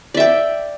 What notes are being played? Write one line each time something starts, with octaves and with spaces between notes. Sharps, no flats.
D5 E5 G5